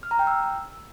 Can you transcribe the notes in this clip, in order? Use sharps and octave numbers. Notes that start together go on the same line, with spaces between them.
F6
A#5
G5
E6